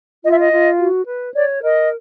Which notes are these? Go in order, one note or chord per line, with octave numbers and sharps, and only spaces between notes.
F4 D#5
E5
D#5
F4
F#4
B4
C#5 D5
A#4 D#5